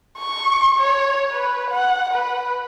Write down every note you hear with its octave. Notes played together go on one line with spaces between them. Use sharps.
C#6
C#5
B4
F#5
B4